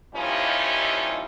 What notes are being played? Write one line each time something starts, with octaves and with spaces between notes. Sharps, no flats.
D#2 F3 G3 C#4 D#4 E4